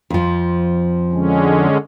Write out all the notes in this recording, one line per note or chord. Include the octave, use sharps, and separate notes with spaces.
F2 F3
D3 G#3 C#4